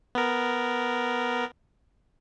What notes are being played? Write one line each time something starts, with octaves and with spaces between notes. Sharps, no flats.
B3 A#4